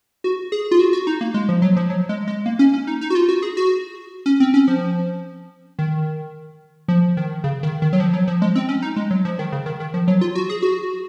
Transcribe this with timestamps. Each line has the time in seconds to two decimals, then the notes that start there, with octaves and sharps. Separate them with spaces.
0.24 F#4
0.52 G#4
0.71 F4
0.79 F#4
0.93 F#4
1.07 D#4
1.21 A#3
1.34 G#3
1.49 F3
1.62 F#3
1.76 F3
1.90 F#3
2.09 G#3
2.27 G#3
2.46 A#3
2.59 C#4
2.74 C#4
2.87 D#4
3.01 D#4
3.10 F#4
3.15 F4
3.29 F#4
3.42 G#4
3.57 F#4
4.26 C#4
4.40 C4
4.54 C#4
4.68 F3
5.79 D#3
6.88 F3
7.17 D#3
7.44 C#3
7.63 D#3
7.82 D#3
7.93 F#3
8.00 F3
8.13 F#3
8.28 F3
8.42 G#3
8.55 C4
8.69 C#4
8.82 D#4
8.96 G#3
9.11 F#3
9.25 F3
9.39 D#3
9.52 C#3
9.66 D#3
9.80 D#3
9.94 F3
10.08 F#3
10.21 F4
10.35 F#4
10.50 G#4
10.62 F#4